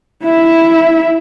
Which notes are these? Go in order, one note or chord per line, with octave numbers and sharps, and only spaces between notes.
E4 E5